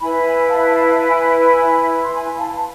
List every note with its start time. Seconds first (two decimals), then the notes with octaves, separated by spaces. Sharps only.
0.01 E4 B4 G#5 B5
0.25 G#5 B5
0.49 F5 A5
0.72 F5 A5
1.08 G#5 B5
1.43 G#5 B5
2.03 C6
2.14 G#5 B5
2.38 F5 A5